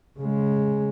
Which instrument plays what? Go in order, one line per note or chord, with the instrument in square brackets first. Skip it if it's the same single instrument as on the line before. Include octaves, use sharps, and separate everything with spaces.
[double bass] C#3 G#3